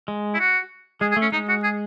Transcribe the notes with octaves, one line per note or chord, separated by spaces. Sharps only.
G#3
E4
F#4
G#3 G#4
G#4
A3
C#4
G#3 D#4
F#4
G#4